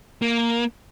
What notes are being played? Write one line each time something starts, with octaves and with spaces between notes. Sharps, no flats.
A#3